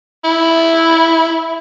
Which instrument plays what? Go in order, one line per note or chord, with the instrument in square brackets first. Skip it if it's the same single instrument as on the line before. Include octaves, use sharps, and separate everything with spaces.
[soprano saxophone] E4